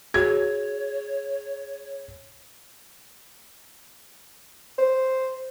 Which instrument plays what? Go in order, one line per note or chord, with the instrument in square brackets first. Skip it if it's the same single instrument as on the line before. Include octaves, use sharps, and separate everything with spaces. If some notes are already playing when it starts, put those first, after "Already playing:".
[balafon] F#4 [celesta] G#4 [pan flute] C#5 [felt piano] G#6
[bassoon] C5